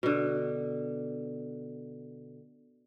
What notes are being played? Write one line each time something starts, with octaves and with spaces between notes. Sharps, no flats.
B2 D3